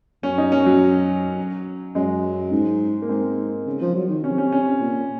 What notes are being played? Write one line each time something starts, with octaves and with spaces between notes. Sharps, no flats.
F#2 C#4
D#4
C#4
F#3
F#2 G#3
G#2
A#3
G#2 C4
C#3
F3
F#3
D#3
C3 C#4
C#4
C#4
A#2